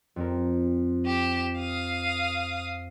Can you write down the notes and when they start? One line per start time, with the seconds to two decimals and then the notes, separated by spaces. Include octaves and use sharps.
0.16 F2 C4 A#4
1.06 G4 C#6 D7 E7
1.58 F5 D#6